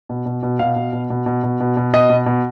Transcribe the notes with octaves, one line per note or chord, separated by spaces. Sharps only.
B2
B2
B2
B2 F5
B2
B2
B2
B2
B2
B2
B2
B2 D#5
B2
B2